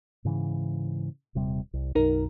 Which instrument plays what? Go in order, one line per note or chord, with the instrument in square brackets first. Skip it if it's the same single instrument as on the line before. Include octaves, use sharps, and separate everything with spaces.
[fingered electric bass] G#2 C#3 E3
D#1 C3 G3
C2
[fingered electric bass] B1 F#2 F#3 [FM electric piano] D#4 A#4